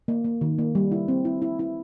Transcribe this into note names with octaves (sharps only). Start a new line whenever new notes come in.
A#3
A#3
D#3
A#3
G3
E4
C4
E4
E4
E4